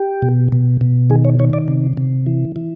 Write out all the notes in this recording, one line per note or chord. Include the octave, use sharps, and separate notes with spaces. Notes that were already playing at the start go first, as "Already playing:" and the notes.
Already playing: G4
B2
B2
B2
D#3 G#4
C#5
D#3 C#5
D5
C3
C3
E3
E3